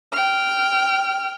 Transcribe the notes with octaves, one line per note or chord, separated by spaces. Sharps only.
G5 F6